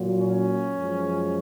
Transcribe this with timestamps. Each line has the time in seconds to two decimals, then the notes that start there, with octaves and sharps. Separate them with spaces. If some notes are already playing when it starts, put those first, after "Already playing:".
Already playing: A#2 F#3
0.20 C#4
0.75 F#2 F3 G#3